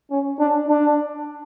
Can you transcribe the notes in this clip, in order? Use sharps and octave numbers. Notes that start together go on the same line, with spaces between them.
C#4
D4
D4